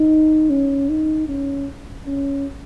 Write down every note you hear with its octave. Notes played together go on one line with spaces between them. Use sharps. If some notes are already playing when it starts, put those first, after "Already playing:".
Already playing: D#4
C#4
D#4
C#4
C#4